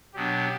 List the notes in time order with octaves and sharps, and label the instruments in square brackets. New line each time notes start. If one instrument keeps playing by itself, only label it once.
[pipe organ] B2 F#3 B3 D4 [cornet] G4